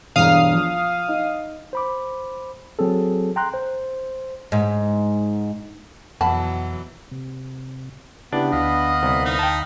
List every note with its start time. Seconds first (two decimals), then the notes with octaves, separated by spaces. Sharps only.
0.16 E1 G2 F5 A#5 D#6
0.53 F3
1.08 D#4
1.73 C5 B5 D6
2.79 F#3 C4 G#4 A4
3.36 G5 A#5 C6 F#6
3.54 C5
4.52 G#2
6.21 F2 B2 E3 F#3 F#5 A5 B5
7.11 C3
8.33 C#3 B3 D4 E4 G4
8.52 D2 D#5 F5 B5
9.03 C2
9.25 D#4
9.39 G5 A5